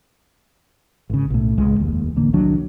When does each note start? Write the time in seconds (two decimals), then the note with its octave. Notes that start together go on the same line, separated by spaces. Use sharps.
1.09 G#1 C#3
1.30 B1 A2
1.58 C#2 G#3
1.80 F1 D#2
2.16 A1 D3 A#3
2.33 C2 D#3 F#3 D4